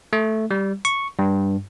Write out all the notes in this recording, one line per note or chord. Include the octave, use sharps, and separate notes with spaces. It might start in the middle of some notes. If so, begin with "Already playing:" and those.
A3
G3
C#6
G2